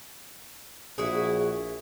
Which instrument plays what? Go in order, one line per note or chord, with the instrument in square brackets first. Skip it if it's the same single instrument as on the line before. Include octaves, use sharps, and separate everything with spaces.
[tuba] A#1 [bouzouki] E4 F#4 G#4